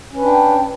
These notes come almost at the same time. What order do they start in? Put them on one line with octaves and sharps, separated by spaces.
C#4 B4 D4 G5